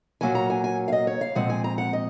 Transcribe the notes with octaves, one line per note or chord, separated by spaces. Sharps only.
A#2 F#3 A#3 C#4 G#5
A#5
G#5
G#5
F5
D#5
C#5
F5
A#2 F3 G#3 C4 F#5
G#5
A#5
F#5
D#5